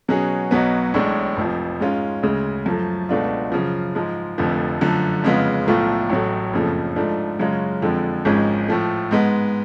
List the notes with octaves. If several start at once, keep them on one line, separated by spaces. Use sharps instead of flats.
B2 F#3 C#4 G#4
B1 B2 F#3 B3
A1 A2 G#3 D4
F1 F2 F3
G#2 G#3 C#4 F4
D2 C#3 G#3
F#2 F3 A3
C#2 B2 A3 D4 F4
F#2 C#3 F3
G#2 F3 G#3
F1 F2 D3 F3 A3
F#2 D3 F3 A3
F2 C#3 G#3 B3 F4
B1 A2 F3 A3 F4
A1 A2 F#3 A3
F#1 F2 C#3 F3 A3
G#2 F3 A3 D4
F#2 C#3 G#3 C#4 F4
F2 D3 F3 G#3
G#1 G#2 F3 G#3 C#4
A2 F3 A3
G#2 G#3 B3